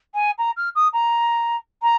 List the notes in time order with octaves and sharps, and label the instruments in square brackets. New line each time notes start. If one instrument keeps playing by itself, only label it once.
[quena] G#5
A#5
F6
D#6
A#5
A#5